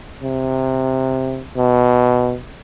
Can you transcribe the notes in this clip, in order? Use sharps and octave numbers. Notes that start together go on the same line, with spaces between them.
C3
B2